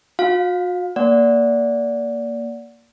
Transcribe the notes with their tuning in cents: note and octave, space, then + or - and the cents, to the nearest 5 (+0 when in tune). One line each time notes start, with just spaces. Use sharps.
F#4 -45 F5 +25
A#3 +0 D5 -20 F#5 -10